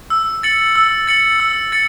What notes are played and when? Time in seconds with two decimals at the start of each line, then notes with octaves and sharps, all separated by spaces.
0.10 E6
0.43 A6 C#7 F#7
0.76 E6
1.08 A6 C#7 F#7
1.40 E6
1.72 A6 C#7